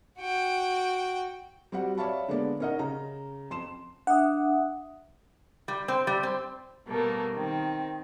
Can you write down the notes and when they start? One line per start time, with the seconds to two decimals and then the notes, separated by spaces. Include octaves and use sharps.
0.19 F#4 G5
1.72 G3 C4 F#4 G4 F#5
1.98 C#5 D5 E5 F5 A5 B5
2.28 D3 G#3 A#3 B3 D5
2.60 C#4 D#4 A#4 D#5 F#5
2.79 C#3 A#5
3.51 F2 C6 E7
4.07 D4 E5 F#5 D#6
5.68 G3
5.88 C4
6.07 G3
6.23 C4
6.87 B2 G3 A3 A#3
7.33 D#3 C4